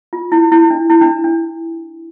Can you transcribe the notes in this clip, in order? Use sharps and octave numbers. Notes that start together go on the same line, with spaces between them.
F4
E4
E4
D4
E4
D4
D4